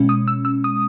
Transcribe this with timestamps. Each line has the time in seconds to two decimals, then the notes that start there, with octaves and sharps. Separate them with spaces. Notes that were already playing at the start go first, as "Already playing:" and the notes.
Already playing: B2 G#3 C#4
0.09 D#6
0.28 E6
0.45 E6
0.64 D#6